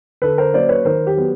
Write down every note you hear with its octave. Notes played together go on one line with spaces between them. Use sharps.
D3 A4 B4
A#4 C5
F#3 A#3 C#4 C5 D5
B4 C#5
D#3 A#4 C5
G4
F#3 B3